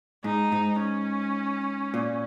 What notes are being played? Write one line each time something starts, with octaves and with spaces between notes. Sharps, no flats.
G#2 D#4
G#2
C#4
A#2